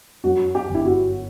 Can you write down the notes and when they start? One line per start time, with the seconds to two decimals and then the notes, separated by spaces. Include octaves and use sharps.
0.24 F#2 F#4
0.55 G4
0.69 G1
0.75 E4
0.85 F#4